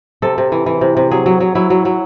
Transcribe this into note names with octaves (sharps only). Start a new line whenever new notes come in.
C3 A4
C3
E3
E3
C3
C3
F#3 G#4
F#3
F#3
F#3 E4
F#3
F#3